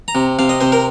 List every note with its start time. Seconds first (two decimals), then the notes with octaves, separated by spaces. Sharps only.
0.08 A#5
0.15 C3
0.39 C3 F5
0.49 D#5
0.61 C3 C5
0.72 A#4